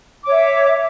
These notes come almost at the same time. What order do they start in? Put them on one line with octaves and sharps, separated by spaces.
D6 C#5 E5